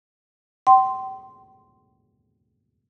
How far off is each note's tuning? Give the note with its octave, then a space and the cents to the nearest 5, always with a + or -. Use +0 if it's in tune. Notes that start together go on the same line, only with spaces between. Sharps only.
G5 -35 C6 -5